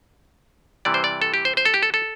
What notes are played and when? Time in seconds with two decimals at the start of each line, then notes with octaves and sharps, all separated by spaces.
0.85 C3 E3 G3 D5
0.94 C5
1.04 D5
1.22 A4
1.34 G4
1.45 C5
1.57 C5
1.65 A4
1.74 G4
1.83 A4
1.94 A4